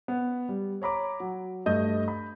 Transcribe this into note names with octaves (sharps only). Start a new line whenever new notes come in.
B3
G3
C#5 A#5 B5 D6
F#3
G2 A3 D#5 G6
B5